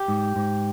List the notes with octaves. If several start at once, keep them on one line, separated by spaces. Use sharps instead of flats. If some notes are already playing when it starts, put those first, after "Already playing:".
Already playing: G4
G#2
G#2